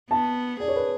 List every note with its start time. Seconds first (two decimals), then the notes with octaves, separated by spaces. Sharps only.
0.11 B3 A5
0.60 G#4 D5
0.68 C#5
0.76 B4